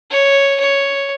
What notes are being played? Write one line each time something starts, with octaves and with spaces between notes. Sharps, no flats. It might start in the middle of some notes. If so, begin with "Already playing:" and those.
C#5
C#5